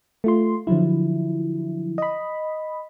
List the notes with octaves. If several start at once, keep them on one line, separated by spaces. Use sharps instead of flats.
A3 F4 C6
D3 F3 F#3 E4
D#5 B5